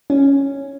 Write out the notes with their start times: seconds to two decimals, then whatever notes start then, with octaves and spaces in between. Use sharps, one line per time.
0.10 C#4